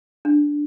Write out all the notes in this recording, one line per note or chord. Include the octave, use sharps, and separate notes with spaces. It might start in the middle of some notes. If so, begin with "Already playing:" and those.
D4